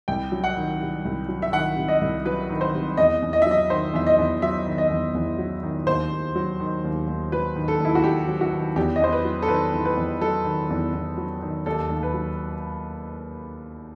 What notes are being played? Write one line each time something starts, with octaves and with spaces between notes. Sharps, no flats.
C2 G5
F#3
F#5
D#3
C3
C2
F#3
E5
D#3 F#5
C3
D#5
C2
F#3 B4
D#3
C5
C3
E2 D#5
E2
D#5
E5
F#3
D#5
D#3 C5
E2 E5
D#5
E2
F#3 E5
D#3
D#5
E2
E2
F#3
D#3
D#2 C5
D#2
F#3
D#3
D#2
D#2
F#3 B4
D#3
A4
D#2 E4
F#4
D#2 G4
F#3
F#4
D#3
E2 G4
D#5
E2 C5
B4
F#3
A4
D#3 B4
E2
B4
E2
F#3 A4
D#3
E2
E2
F#3
D#3
D#2 A4
D#2
B4
F#3